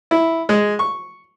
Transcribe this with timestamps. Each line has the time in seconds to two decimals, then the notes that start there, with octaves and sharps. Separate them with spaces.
0.11 E4
0.49 G#3
0.79 C#6